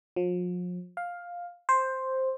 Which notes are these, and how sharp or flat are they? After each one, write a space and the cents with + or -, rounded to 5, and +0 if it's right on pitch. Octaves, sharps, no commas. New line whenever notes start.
F3 +40
F5 +10
C5 +5